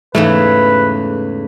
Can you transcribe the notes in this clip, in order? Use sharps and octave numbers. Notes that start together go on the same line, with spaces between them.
E2 G#2 C#3 A3 B4